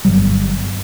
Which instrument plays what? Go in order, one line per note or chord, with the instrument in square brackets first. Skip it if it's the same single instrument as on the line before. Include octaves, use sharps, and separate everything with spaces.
[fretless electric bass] G1 G2 F#3 G3